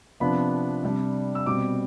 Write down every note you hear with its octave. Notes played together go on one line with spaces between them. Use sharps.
C3 F3 B3 D4 B5
C3 G3 D4
E6
B2 G3 C4 D6